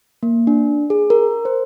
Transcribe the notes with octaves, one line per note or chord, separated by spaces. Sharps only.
A#3
D4
G#4
A#4
C5